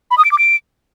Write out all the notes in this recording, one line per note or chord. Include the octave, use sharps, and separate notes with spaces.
B5
D#6
D7
D6
D7